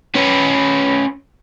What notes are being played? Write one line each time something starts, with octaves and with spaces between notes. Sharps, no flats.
C#4 B4